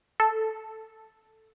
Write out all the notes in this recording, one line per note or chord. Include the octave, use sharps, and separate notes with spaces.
A4